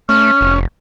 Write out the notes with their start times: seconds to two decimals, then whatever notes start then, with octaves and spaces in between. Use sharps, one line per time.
0.09 A3 C#4 F6
0.41 F1